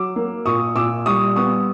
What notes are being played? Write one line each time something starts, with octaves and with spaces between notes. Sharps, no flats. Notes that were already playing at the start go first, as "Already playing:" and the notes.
Already playing: F#3 D6 E6
A#3
A#2 C#6 D#6
A#2 D6 E6
G3 C#6 D#6
B3 C#6 D#6